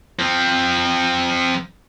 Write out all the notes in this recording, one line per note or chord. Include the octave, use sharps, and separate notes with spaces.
F3 C4